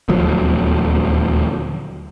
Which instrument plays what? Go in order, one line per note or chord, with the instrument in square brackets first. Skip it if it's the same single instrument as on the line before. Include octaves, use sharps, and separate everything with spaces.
[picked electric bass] D#1 D2 F3 F#3